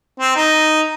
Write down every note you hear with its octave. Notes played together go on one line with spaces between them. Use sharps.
C4
D#4